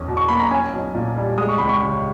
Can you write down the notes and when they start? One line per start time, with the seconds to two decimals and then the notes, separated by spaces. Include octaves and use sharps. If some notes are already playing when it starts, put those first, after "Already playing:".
Already playing: E2 C#4
0.08 B2
0.17 C#6
0.28 A#3 B5
0.40 A#5
0.51 C#4 G#5
0.73 B1
0.95 A#2
1.16 G3
1.38 G#3 D#6
1.49 C#6
1.58 C#2 B5
1.69 C#6
1.81 C#3